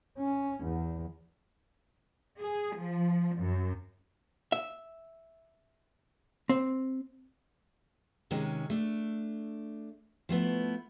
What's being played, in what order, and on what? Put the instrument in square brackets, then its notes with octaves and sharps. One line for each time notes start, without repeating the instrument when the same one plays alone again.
[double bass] C#4
E2
[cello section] G#4
F3
F#2
[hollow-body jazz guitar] E5
C4
[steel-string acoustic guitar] C3 D#3 G#3 C#4
A3 D4
F3 A3 B3 E4